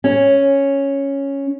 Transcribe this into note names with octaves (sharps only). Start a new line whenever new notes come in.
C#4